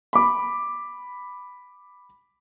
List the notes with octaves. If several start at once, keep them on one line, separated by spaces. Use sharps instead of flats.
B5 D6